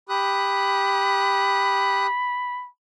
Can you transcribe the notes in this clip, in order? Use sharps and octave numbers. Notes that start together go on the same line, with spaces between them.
G4 B5 D#6 F#6